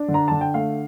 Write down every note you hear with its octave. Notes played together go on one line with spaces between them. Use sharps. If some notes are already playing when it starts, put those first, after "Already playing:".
Already playing: D4
D3
A#5
D3 A5
G5
A3 F5